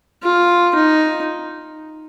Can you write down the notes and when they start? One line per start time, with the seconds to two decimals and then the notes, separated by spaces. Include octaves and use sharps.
0.23 F4
0.75 D#4